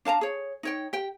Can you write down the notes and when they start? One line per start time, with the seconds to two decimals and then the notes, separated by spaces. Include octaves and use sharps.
0.05 D4 F5 A5 A#5
0.21 G#4 C#5
0.63 D#4 C#5 G5
0.93 G4 G5